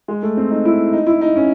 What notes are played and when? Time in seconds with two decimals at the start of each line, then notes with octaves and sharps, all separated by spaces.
0.08 G#3
0.23 A3
0.37 C4
0.51 D#4
0.65 E4
0.93 D#4
1.07 E4
1.21 D#4
1.36 C#4